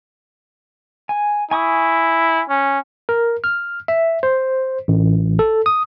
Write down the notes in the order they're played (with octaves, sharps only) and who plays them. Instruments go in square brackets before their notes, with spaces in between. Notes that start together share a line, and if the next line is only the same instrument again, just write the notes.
[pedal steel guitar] G#5
[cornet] E4 [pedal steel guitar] G#5 C#6 D#6
[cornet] C#4
[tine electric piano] A#4
F6
E5
C5
A1
A4
D#6